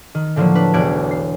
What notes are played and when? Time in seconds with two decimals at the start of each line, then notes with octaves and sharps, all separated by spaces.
0.15 D#3
0.36 A2 D3 F3 F#3 A#3
0.55 D4 B4
0.73 E1 B1 D5 F#6 G#6 D7
1.11 C7